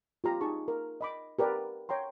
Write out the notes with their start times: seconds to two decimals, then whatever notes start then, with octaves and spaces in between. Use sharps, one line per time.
0.24 F4 G4 A#5
0.41 D#4 G#4 A5 C#6
0.68 A#4
1.01 D#5 B5 D6
1.39 G4 A#4 B4 D5
1.89 C#5 G5 A#5 C6